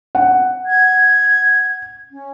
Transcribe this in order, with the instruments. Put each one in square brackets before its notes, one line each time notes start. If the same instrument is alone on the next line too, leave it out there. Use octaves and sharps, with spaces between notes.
[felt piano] F#5
[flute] G#6
C#4